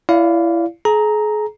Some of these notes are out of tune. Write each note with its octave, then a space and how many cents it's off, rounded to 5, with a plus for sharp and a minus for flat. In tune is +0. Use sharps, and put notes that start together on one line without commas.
E4 +25 D5 -30 F5 +0
G#4 +35 A#5 +0